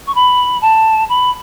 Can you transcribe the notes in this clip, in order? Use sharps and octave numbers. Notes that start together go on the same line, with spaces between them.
C#6
B5
A5
B5